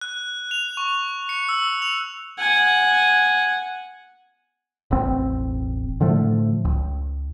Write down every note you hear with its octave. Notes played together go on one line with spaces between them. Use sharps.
F#6
F7
C#6
C#7
E6
F7
F#5 G#5
E1 A1 C4
A2 D3 F3 A3
C#2